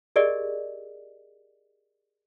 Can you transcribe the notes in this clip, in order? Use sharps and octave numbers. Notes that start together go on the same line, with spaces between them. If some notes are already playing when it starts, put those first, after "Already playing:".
G4 G#4 A#4 D5 D#5